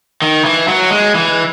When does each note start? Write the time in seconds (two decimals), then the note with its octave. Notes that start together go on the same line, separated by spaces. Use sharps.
0.22 D#3
0.45 E3
0.68 F#3
0.90 G#3
1.14 E3